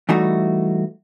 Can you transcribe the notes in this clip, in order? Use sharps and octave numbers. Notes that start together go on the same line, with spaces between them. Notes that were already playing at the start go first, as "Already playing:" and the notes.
E3 G3 A3 D#4 F#4